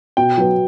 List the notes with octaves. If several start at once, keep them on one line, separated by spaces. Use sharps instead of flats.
B2 G5
F#3 B3